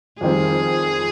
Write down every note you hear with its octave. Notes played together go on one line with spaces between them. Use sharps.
F2 D#3 G3 C4 F4 G#4